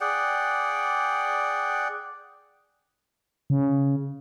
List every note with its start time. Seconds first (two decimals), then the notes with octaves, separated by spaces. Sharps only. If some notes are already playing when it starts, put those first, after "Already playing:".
0.01 G#4 D5 F#5 G5
3.50 C#3